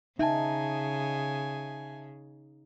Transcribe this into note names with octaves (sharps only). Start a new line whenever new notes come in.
C#3 D#4 E5 G#5 A5